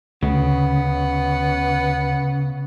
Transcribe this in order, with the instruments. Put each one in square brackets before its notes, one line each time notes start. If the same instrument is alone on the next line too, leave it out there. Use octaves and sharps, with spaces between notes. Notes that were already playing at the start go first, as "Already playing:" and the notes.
[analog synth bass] D2 [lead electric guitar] C#3 [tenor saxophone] B3